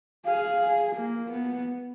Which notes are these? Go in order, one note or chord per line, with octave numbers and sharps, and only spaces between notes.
G#4 F5
A#3
B3